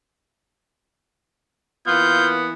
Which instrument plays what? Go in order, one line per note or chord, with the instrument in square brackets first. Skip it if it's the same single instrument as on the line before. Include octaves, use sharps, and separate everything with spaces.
[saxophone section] E3 A#3 B3 [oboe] F4 [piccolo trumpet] G6